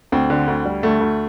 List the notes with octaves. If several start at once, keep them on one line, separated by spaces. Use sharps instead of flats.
D2 C4
D3
D2
G3
D2 A3
D2